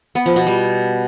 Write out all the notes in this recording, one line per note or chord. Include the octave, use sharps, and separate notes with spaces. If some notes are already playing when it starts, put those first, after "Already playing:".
B3
F3
B2
G3